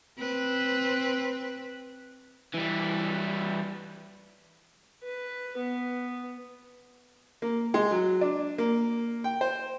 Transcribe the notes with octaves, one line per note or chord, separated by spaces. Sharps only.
C4 B4
E3 G3
B4
B3
A#3
G#3
F#3
D4
A#3
G5
C5